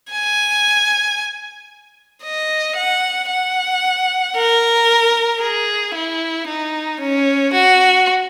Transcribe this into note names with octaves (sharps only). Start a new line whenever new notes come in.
G#5
D#5
F#5
F#5
A#4
G#4
E4
D#4
C#4
F#4